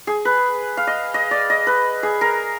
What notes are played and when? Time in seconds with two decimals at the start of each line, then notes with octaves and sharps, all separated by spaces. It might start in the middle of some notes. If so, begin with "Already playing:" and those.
0.07 G#4
0.25 B4
0.77 F5
0.87 D#5
1.14 D#5
1.31 D5
1.50 D#5
1.67 B4
2.03 G#4
2.21 A#4